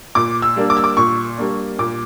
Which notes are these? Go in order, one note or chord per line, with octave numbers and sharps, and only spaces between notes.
A#2 D6
E6
G3 A#3 D4
D6
E6
D6
A#2 C#6
G3 A#3 D4
A#2 D6